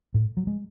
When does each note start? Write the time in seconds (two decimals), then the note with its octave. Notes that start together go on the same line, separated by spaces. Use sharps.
0.14 A2
0.37 F#3
0.47 G#3